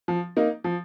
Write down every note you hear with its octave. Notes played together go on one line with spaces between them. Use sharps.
F3
A#3 D#4
F3